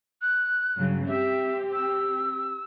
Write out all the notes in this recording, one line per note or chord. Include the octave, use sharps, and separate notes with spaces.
F#6
G2 C#3 F#3
C4 G4 E5
E6